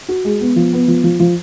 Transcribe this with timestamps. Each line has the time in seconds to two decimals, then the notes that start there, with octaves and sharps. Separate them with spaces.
0.09 F#4
0.25 G#3
0.41 B3
0.56 F3
0.73 B3
0.88 F3
1.04 F3
1.20 F3